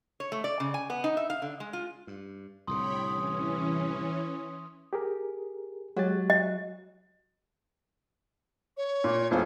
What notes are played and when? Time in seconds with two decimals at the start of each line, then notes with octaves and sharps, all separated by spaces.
0.20 C#5
0.32 A3
0.44 D5
0.60 C#3
0.74 G#5
0.90 B3
1.04 D#4
1.17 E5
1.30 F5
1.42 D3
1.60 G#3
1.73 F4
2.07 G2
2.67 C2 A2 D3 C#5 G5 B5 C6 D#6
3.07 E3 C#4 D#6
4.93 G4 G#4 A#4
5.96 F#3 G#3 G4 A6
6.30 D#5
8.77 C#5
9.04 A#2
9.31 E1 A3 F4 C5